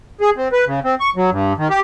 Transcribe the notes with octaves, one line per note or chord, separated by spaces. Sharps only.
G#4
C4
B4
C#3
C4
C#6
F#3
G2
D#3
G4